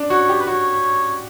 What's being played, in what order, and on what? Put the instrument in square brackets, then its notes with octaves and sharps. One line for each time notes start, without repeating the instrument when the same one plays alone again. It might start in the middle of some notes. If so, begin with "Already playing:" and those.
Already playing: [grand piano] D4
[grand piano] F#4 [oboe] C#5
[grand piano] G4
[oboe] B4
[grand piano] F#4 [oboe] C#5